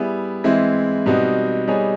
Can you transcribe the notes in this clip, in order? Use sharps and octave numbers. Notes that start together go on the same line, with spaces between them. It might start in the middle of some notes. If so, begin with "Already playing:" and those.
Already playing: G3 B3 E4 G#4
E3 G#3 C4 E4
B2 G3 C4 D#4 F#4
G3 B3 D#4 G#4 C#5